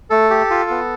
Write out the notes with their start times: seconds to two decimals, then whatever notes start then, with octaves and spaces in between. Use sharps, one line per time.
0.10 A3 A4
0.30 G4
0.50 F4
0.70 B3